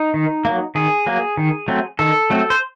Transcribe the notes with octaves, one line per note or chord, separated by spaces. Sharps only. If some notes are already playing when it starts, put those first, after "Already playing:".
Already playing: D#4
D#3
F#3 A#3
D#3 G#4
F#3 A#3
D#3
F#3 A3 C4
D#3 A4
F#3 A3 C4
C5